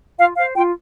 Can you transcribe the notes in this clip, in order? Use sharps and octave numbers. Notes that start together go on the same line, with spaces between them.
F4 F5
C5 F5
F4 G5